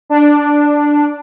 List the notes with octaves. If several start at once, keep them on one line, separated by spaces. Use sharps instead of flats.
D4